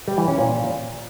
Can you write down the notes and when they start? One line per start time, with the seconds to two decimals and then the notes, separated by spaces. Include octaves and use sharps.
0.08 G3
0.18 E3
0.28 C#4
0.38 A#2